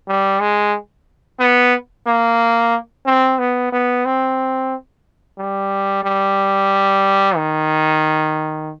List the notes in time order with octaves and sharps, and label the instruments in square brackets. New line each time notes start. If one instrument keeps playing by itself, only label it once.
[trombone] G3
G#3
B3
A#3
C4
B3
B3
C4
G3
G3
D#3